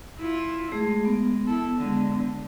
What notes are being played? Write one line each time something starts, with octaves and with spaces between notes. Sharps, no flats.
E4 F4
G#3 A3 G#4
B3
E4 A4
D3 G#3
D3